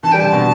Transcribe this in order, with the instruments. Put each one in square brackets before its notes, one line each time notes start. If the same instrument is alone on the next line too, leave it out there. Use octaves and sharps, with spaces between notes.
[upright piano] E3 [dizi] A5
[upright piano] G3 [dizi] G5
[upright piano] D3 [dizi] A5
[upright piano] B2